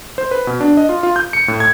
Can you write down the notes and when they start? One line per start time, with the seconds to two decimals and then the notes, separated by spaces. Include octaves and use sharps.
0.18 C5
0.31 B4
0.47 B2
0.61 D4
0.77 D#5
0.89 F4
1.03 F4
1.16 G6
1.33 C#7
1.48 A2
1.60 G#6